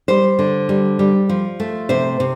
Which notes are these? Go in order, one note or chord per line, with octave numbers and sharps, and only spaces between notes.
G3 C5
D3
G3
G3
F3
A3
C3 C5
C3